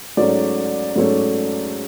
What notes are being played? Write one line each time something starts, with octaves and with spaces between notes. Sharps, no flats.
G#2 F#3 A3 C#4 D5
G#2 F#3 A3 C#4